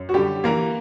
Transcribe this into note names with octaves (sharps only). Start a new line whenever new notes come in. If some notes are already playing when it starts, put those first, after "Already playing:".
Already playing: F#2
F#4
D3 G3 G4
E3 A#3 A#4